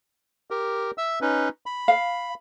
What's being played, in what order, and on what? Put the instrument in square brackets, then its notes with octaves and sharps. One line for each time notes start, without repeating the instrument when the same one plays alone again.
[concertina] G4 A#4
E5 E6
C#4 D#4 B4
B5
[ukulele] F5